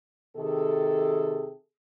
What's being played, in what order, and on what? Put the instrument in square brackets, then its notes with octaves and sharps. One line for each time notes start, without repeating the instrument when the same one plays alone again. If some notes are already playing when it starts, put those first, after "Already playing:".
[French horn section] C3 D#3 G#4 A4